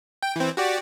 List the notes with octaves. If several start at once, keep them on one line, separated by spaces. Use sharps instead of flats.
G5
E3 C4
F#4 G4 D5